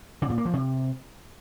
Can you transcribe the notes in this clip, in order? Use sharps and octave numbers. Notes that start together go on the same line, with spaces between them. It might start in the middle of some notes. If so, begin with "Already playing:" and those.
C#3
A#2
A#3
F3
C3